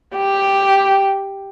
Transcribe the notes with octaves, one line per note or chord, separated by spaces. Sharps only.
G4